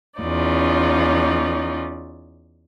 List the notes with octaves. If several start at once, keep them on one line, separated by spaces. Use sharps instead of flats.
E2 C#4 D#4 F4 D5